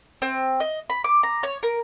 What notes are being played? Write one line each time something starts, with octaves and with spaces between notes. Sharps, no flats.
C4
D#5
B5
D6
A#5
C#5
A#4